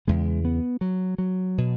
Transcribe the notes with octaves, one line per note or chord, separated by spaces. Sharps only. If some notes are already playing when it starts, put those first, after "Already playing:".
E2 C#3 G#3
B3
F#3
F#3
B2